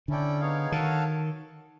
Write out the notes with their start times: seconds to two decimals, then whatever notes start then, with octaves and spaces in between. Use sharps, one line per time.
0.08 D3 C#4 E4 A4 D5 G5
0.40 B3 D#4 G#4 C#5 F5
0.72 D#3 F#4 A4 C#5 F5 A5